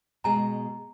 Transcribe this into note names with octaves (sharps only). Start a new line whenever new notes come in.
B2 G#3 G#5 A#5